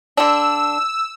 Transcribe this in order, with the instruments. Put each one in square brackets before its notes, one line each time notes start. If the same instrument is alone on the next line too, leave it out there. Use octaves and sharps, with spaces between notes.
[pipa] D3 D4 [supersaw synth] E6